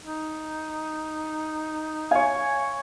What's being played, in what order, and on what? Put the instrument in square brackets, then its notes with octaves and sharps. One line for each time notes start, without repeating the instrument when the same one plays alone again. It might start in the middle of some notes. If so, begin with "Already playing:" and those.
[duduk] D#4
[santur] C#5 G#5 [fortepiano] F5